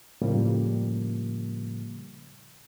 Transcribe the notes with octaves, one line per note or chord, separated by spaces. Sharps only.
A2 C#3 F3 G3 A#3